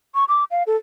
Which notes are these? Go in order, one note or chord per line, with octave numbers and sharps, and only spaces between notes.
C#6
D6
F5
A4